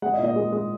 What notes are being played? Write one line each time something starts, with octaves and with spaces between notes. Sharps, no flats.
G#3 F#5
D#5
A#2
D#5
G#3
G#3